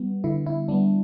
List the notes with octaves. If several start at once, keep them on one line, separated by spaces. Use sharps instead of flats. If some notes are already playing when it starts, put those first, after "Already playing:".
Already playing: G3 B3
D3 E4
E4
G3 B3 D4